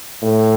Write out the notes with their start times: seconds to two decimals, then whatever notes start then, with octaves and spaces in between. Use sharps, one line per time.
0.22 A2